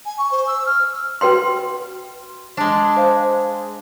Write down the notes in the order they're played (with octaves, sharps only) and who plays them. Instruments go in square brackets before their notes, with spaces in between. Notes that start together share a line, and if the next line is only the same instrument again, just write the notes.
[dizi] G#5
C#6
C5
E6
F6
[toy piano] F#4 B4 G5 C6
[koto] G#3 D4
[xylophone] C5 F5